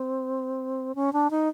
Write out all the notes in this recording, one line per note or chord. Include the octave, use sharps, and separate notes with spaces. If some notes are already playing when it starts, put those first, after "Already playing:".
Already playing: C4
C#4
D4
D#4